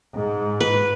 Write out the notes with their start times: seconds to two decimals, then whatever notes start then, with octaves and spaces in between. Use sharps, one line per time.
0.16 G#2
0.60 B4